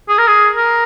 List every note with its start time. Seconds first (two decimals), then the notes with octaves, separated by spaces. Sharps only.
0.09 G#4
0.18 A#4
0.27 G#4
0.56 A#4